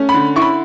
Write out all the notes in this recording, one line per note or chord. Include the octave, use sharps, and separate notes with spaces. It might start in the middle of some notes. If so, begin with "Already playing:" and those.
Already playing: A3 C#4
B5
D3
E4 C#6
B5